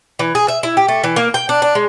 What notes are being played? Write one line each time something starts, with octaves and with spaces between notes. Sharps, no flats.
E3
G#4
E5
E4
G4
A3
E3
A#3
G5
D4
D4
G#3